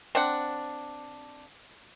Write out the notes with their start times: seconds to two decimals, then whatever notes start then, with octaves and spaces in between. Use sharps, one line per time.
0.15 C4 D4 F#5